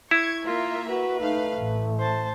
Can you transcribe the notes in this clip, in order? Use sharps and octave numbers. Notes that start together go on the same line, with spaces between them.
E4 C#6 G#6
A#3 F4 A#4 E5
F#4 B4
A3 D#4 F5
A1
C5 A5